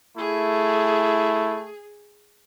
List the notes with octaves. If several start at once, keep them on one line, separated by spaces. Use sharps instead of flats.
A3 E4 G#4